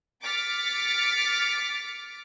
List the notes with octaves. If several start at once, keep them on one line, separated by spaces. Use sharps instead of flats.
D6 F6 A6 B6 C#7